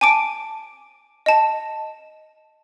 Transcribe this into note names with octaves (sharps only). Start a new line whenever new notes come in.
G#5 A5 D6 D7
D#5 A5